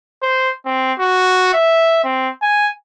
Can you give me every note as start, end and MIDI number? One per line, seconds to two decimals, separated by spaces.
0.23 0.50 72
0.66 0.93 60
0.99 1.53 66
1.54 2.03 76
2.04 2.29 60
2.42 2.68 80